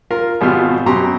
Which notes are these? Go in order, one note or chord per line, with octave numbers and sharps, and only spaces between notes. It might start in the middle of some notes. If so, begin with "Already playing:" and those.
F4 A#4
G#1 B2 G3 F4 F6
F#2 B2 G4 A#5 C6